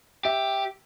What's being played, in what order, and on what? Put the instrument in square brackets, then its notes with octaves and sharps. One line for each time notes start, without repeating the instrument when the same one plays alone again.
[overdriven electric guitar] G4 [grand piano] E5